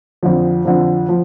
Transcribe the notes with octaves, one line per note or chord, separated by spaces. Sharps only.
F2 D3 F3
F2 D3 F3
F3